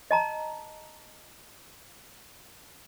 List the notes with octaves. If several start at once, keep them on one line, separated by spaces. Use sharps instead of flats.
D#5 A5 A#5